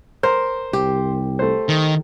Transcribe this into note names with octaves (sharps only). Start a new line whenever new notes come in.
A#4 C5
C2 G4
A3 C5
D#3